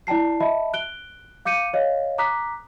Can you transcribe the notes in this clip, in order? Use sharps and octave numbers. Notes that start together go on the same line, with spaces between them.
E4 D5 G5 A5 C7
D#5 E5 A5 B5
F#6 D7 G7
F5 D6 G6 C#7 D#7
C#5 D#5 F5
A#5 D6 D#6 F#6 B6